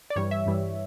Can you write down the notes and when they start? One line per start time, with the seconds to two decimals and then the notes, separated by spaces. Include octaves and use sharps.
0.10 D5
0.16 G2 E3 G3 C#5
0.31 E5
0.46 G2 E3 G3